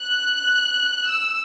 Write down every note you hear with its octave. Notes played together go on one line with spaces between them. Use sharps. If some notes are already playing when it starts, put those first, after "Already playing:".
Already playing: F#6
E6